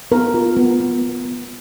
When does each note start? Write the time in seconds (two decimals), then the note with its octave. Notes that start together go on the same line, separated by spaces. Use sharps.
0.11 B3 A#4
0.34 F4
0.57 B3
0.80 B3
1.02 B3
1.25 B3